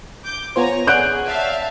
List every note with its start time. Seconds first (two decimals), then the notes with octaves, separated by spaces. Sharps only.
0.24 D6 G6
0.56 B3 F4 C5 C#5 G#5 A#5
0.87 G#4 C#5 D5 F#5 F#6 G6 D7
1.27 E5 F5 A5